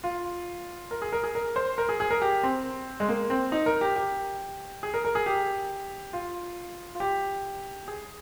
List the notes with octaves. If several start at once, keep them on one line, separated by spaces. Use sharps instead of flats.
F4
A#4
G#4
A#4
G#4
A#4
C5
A#4
G#4
G#4
A#4
G4
C4
G#3
A#3
C4
D#4
A#4
G4
G4
G#4
A#4
A#4
G#4
G4
F4
F4
G4
G#4